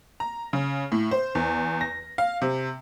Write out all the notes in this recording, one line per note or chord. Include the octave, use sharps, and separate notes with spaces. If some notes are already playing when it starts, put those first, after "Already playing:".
A#5
C#3
A2
C5
E2
A#6
F5
C3